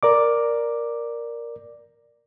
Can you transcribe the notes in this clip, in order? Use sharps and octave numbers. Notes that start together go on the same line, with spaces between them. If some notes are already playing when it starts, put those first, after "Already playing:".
A#4 D5 D6